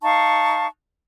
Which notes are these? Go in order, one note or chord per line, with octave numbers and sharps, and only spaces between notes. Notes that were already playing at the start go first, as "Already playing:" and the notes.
D#4 F5 A5 C#6